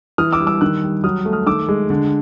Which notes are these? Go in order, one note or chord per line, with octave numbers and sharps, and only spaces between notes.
E3 D#6 F6
D6 E6
G3
D6 E6
D#3 E6 F#6
G3
F#3 D#6 F6
A3
D#6 F6
D#3 D6 E6
G#3
D3